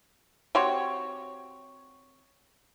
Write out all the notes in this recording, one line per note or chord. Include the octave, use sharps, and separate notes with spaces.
C4 F#4 G4 C#5